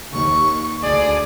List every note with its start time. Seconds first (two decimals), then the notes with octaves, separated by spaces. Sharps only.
0.13 D#2 C#6
0.83 D2 G#4 D5